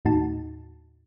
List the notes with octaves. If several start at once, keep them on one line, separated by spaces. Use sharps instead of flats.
D#2 A2 D#4 F#4 A5